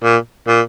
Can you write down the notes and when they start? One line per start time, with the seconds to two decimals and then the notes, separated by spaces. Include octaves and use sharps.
0.03 A#2
0.48 A#2